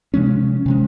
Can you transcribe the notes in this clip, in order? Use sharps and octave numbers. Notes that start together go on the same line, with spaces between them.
C3 F3 G#3 C#4
C3 F3 G#3 C#4